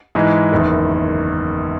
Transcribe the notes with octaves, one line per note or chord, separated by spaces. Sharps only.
G#2 E3 G#3
F#1 E2 D#3